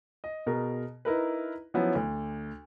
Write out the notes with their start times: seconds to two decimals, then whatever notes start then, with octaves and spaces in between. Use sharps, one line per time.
0.24 D#5
0.47 B2 G#4 A#4
1.05 D#4 E4 A#4 B4
1.74 F3 F#3 B3 C#4 E4
1.95 D2